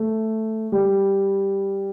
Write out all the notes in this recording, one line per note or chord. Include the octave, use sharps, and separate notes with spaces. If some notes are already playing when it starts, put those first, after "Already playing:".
Already playing: A3
G3